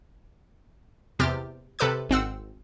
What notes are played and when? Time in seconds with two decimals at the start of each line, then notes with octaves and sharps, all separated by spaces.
1.19 E2 C3 G4 F6 A6
1.79 C3 A4 B4 D6 G6
2.09 G#1 C4 F#5 E6